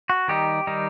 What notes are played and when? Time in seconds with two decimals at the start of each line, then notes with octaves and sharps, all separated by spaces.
0.10 F#4
0.28 D#3 G3 D#4 G4
0.67 D#3 G3 D#4